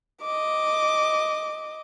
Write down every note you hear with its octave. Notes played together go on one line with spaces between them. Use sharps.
D#5 D6